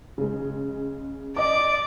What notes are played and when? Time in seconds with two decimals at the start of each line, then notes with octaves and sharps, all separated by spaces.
0.18 C#3 G#3
1.36 D5 D#5 D6